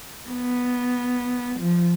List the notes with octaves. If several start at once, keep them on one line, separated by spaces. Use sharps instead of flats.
B3
F3